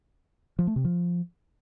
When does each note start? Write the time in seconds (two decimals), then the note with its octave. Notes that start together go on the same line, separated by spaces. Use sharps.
0.59 F3
0.67 A3
0.76 C3
0.85 F3